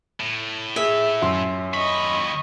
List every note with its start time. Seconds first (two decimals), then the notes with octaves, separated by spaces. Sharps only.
0.20 A2
0.76 G#4 E5
1.22 F#2 C6 E6
1.74 D#2 D#5 B5 C#6